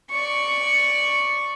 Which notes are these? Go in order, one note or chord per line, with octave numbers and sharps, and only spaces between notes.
D5 C#6